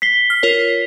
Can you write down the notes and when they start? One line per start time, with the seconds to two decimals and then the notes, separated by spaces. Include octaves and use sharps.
0.02 B6 C7 G7
0.30 F6
0.43 F4 A#4 C#5